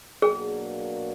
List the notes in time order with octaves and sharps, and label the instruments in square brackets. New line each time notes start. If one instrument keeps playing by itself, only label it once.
[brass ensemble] B2 F#3 A#3 D4 F#4 [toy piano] G#4